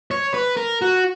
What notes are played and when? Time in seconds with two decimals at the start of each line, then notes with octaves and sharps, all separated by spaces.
0.11 C#5
0.34 B4
0.57 A#4
0.82 F#4